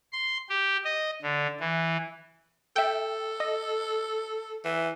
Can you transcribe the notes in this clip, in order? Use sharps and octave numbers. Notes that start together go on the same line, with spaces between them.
C6
G4
D#5
D3
E3
A4 E5 G5
D#5
E3